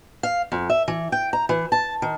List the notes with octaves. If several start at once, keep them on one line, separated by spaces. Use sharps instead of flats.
F5
F2
E5
E3
G5
A#5
E3
A5
D#3